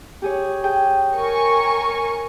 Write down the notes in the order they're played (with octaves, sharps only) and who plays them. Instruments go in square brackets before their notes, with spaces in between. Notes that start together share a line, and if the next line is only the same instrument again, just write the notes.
[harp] G4 G#4 C#5
G#4 G5
[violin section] A#4 G#5 C#6